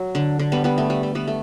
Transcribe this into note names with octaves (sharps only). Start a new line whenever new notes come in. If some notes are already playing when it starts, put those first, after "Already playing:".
Already playing: F#3
D3
D3
G3 B3
G3 B3
A3
G3
A3
G3 B3
A3